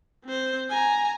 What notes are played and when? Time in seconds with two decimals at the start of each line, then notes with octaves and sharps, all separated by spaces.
0.25 C4 C5
0.69 G#5 A#5